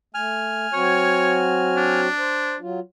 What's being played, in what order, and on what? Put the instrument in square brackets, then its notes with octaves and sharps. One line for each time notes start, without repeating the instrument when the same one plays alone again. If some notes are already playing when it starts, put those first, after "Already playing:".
[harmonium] A3 [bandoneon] G#5 F6
[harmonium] F#3 C4 F#4 [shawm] C#5
[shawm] D4
[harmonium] C5
F#3 F4